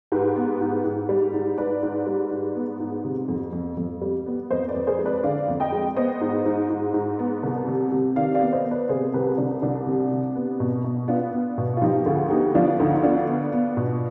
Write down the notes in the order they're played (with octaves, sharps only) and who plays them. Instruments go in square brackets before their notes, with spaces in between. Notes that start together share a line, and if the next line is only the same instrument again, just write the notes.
[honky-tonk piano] G#2 G4 B4
B3
G#2
G#2
G3
G#2
G#2 B4 D5
G#2
G3
G#2
B3
G#2
C3
F2
F2
F2
G3
B3
F2 C5 D#5
B4 D5
F2
G#4 C5
G#3
B4 D5
D3 D5 F5
F2
D#5 G5
G#3
B3 C5 D#5
G#2
G#2
G#2
G#2
B3
C2
C3
C3
D#3 D5 F5
D5 F5
B3
C5 D#5
B3
B4 D5
C3 G#4 C5
C2 G4 B4
C2 D4
C2 D4
C3
C3
B3
B2
B2
B3 D4 F4
B3
B2
F4
F3 D#4 G4
D2 F4 G#4
B3 D#4 G4
F3 D4 F4
D2 D#4
F4
D#4
B3 D4 F4
B3
B3
B2